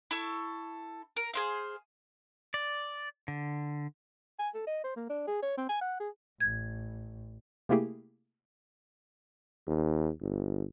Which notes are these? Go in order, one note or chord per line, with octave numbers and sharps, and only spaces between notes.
E4 A4 C#6
A#4
G#4 C5 F5
D5
D3
G#5
A4
D#5
C5
A#3
D4
G#4
C#5
C4
G#5
F#5
G#4
A1 G#6
C3 A3 A#3 E4 G4 G#4
D#2
G1